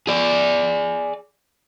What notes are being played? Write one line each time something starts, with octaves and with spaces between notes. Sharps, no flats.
G#4 D5